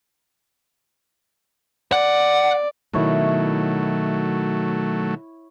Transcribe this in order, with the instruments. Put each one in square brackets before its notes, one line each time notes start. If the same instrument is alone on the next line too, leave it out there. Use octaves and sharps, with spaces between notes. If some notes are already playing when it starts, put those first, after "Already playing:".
[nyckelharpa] D5 [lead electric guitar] F#5
[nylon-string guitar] B2 D#3 [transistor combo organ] F#3 A3 [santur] E4 C#5 C#6